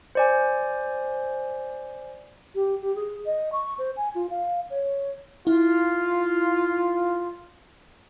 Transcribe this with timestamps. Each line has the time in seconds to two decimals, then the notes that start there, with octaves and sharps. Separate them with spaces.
0.15 C5 D5 G#5
2.55 G4
2.82 G4
2.96 G#4
3.26 D#5
3.52 C#6
3.79 C5
3.97 G#5
4.15 F4
4.30 F5
4.70 C#5
5.47 E4 F4